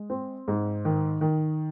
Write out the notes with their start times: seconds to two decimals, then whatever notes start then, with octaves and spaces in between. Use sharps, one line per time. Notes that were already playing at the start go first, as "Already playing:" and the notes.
Already playing: G#3
0.10 C4
0.48 G#2
0.85 D#3
1.21 D#3